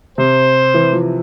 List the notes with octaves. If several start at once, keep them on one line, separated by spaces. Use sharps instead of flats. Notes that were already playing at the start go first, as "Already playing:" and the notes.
C3 C5
E3
F3